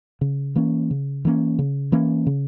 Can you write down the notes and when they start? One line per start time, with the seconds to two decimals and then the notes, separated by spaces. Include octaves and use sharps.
0.21 C#3
0.56 E3 A#3 C#4
0.91 C#3
1.25 E3 A#3 C#4
1.59 C#3
1.92 E3 A#3 C#4
2.26 C#3